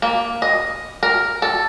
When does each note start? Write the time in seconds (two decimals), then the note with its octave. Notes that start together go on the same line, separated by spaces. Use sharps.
0.02 A#3
0.42 D#5
1.03 A#4
1.42 A4